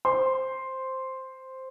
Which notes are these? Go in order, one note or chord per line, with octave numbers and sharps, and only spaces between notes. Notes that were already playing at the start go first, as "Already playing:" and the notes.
C5 C6